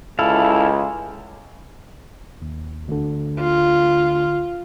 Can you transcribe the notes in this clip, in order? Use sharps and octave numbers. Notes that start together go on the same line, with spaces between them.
C#2 E4 A4 F5
D#2
D2 D3
F4